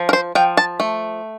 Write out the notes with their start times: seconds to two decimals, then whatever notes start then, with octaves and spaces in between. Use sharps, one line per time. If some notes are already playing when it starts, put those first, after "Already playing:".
Already playing: F3
0.09 A#4
0.13 C5
0.35 F3 G5
0.57 A5
0.80 A3